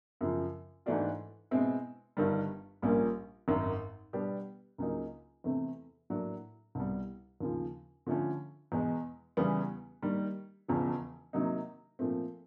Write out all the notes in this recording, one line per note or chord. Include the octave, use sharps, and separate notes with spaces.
F#2 C#3 F3
G#2 E3 A3 D4 F#4
B2 G#3 C4 E4
G1 G2 D#3 G3
A#1 A#2 G3 A#3 C#4
G#1 F#2 D#3
B2 G3 B3 D4 G4
C#2 C#3 F#3 A#3 D#4
E2 C3 E3 A3 C4
A2 F#3 A#3 D4
C2 B2 G3
D#2 C#3 F3
D3 F3 A3 C#4
E2 B2 G#3
E2 C#3 E3 G3 B3
D#3 G3 A#3
E1 E2 C#3 F3
C3 D#3 F#3 A#3 D#4
A#2 F3 A3 C4